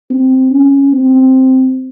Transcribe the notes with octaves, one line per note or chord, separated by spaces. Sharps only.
C4
C#4
C4